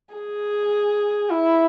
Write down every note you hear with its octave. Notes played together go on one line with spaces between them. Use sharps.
G#4
E4